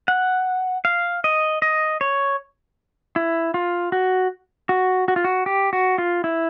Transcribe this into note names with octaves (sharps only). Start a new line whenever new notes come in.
F#5
F5
D#5
D#5
C#5
E4
F4
F#4
F#4
F#4
F4
F#4
G4
F#4
F4
E4